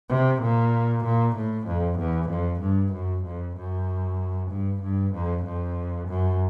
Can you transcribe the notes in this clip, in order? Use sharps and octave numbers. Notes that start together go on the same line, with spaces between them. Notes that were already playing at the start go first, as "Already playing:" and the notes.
C3
A#2
A#2
A2
F2
E2
F2
G2
F#2
F2
F#2
G2
G2
F2
F2
F#2